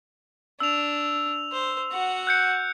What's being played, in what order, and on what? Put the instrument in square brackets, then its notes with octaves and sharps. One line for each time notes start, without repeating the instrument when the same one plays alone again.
[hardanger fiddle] D4 [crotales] E6 F7
[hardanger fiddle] C5
F#4 F#5
[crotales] F#6 G6 C#7